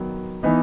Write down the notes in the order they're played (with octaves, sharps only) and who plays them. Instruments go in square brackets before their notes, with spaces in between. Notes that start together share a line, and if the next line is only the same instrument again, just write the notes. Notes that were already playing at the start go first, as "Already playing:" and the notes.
Already playing: [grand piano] D#3 F#3 B3
E3 B3 D#4